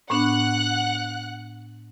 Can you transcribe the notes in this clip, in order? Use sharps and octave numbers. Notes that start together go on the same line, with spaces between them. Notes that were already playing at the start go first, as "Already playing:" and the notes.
A2 B3 D4 F#5 F#6